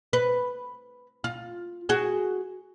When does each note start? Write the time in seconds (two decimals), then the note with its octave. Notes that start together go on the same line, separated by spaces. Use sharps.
0.13 B4
1.24 F4
1.89 F#4 G#4